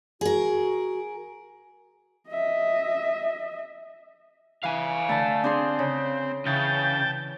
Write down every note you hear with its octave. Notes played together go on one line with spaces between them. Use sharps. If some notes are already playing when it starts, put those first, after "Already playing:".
F#4 G#4 A#4
D#5 E5
E3 F5 G#5
D3 A3 A5
C4 D4 G#4 C6
C#3
C#3 E3 G5 A5